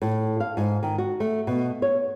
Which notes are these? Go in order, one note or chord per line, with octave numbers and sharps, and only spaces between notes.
A2
F5
G#2
D#3
F#4
A3
B2
C#5